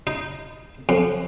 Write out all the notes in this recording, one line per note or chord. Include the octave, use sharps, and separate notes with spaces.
D#4
F2